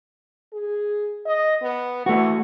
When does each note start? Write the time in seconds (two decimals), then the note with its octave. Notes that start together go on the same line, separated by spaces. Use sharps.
0.53 G#4
1.25 D#5
1.62 B3
2.06 E3 A3 F#4